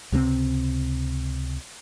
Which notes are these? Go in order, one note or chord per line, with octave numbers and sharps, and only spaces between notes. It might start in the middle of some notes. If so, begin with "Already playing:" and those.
C#2 C3 G3 C4